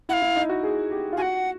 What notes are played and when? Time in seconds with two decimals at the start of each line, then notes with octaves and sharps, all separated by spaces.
0.09 E4 F#5
0.13 F5
0.22 E4
0.36 D#4
0.49 F#4
0.63 G#4
0.91 G4
1.13 F4
1.17 F#4 F#5 G#5